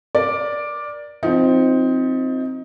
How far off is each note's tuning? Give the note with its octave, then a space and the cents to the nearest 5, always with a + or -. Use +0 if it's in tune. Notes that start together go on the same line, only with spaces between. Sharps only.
A#4 +25 D5 +0
F3 +0 C4 +0 D#4 +20